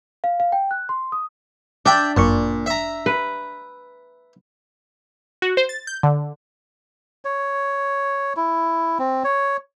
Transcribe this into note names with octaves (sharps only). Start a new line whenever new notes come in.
F5
F5
G5
F#6
C6
D#6
D4 D5 E5 G5
G1 F#2 A#2 C#6
E5 A#5
B4
F#4
C5
A6
G6
D3
C#5
E4
C4
C#5